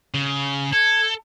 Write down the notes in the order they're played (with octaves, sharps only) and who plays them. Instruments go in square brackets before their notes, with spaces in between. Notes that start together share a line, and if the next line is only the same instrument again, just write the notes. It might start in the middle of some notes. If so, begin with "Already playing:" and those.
[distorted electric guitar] C#3
[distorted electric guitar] A4 [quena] G#6